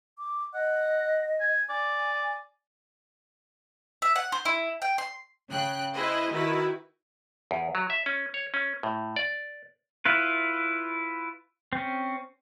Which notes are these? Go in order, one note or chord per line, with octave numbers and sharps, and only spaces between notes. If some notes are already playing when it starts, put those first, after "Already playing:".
D6
D#5 F#5
G#5
D5 G#5
E5
F#5
C5
E4
G5
C6
C#3 G5 F#6
E4 G#4 B4 C5 D#5
D#3 E4 F#4 B4
E2
F#3
E5
C#4
C#5
C#4
A2
D5
E4 F4 B4
C4 C#4